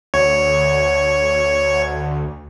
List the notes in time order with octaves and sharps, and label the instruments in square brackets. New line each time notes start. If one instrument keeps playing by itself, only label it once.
[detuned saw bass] D2 [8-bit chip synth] C#5